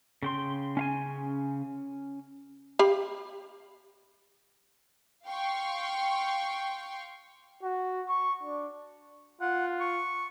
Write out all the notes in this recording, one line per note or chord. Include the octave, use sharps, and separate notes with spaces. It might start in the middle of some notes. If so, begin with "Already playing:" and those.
C#3 G5 C6
C#4 F5 G#5
G4 F5 B5
F5 G5 C6 C#6
F#4
C#6
D4
F4 F#5
C#6